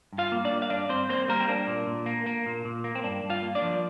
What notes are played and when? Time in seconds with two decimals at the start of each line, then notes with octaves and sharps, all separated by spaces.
0.13 G2
0.18 F4 F5
0.32 A#3
0.45 D4 D5
0.51 G3
0.62 F5
0.70 G2 D4 D5
0.89 G2 C4 C5
1.09 A#3 C4 C5
1.28 G3 A#3 A#4
1.40 C4
1.49 A#3 D4
1.67 A#2
1.87 A#2
2.06 A#3
2.26 A#3
2.46 A#2
2.65 A#2
2.84 A#3
2.95 C4
3.04 G2 D4
3.24 G2
3.30 F4 F5
3.42 A#3
3.55 D4 D5
3.62 F3